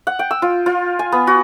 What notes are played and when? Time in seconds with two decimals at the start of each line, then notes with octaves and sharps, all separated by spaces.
0.07 F#5
0.19 G5
0.31 E6
0.42 F4
0.66 F4
0.99 G#5
1.12 B3
1.27 F#4